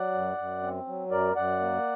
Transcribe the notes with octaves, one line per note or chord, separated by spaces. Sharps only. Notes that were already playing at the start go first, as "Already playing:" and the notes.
Already playing: F#3 D5 F#5
F#2
F#2
C4
F#3
F#2 A#4 D5
F#2 D5 F#5
A#3